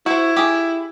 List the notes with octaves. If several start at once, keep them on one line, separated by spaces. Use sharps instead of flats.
E4 F#4 C5
G4 G#4